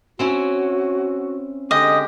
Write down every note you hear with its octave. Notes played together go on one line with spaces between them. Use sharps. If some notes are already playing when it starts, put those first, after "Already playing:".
C4 C#4 E4 F#4
D3 G#3 G4 D#5